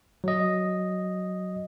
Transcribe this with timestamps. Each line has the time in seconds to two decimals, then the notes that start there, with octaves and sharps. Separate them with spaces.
0.24 F#3 D#5